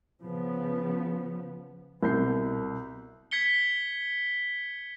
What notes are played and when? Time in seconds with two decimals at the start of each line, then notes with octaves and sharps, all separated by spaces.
0.22 C#3 F3 B3
2.03 C2 B2 G6 C7
3.31 G#6 B6 C#7 G7